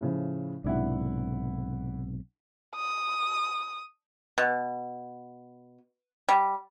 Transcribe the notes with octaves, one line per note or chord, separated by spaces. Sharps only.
A2 C#3 F3
B1 G#2 C3 D4 E4 F#5
D#6
B2
G3